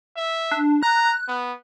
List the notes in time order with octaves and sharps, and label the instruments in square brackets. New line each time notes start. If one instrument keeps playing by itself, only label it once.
[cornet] E5
[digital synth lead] D4
[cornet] A#5 [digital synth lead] F#6
[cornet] B3